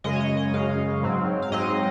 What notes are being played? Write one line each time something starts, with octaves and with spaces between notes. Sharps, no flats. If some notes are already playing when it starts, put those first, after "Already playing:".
F#2 C#3 G#3 D#5
C#5
D#5
D#5
F#2 C#3 G#3 F5
G#2 F#3 C4
F5
G#2 F#3 C4 D#5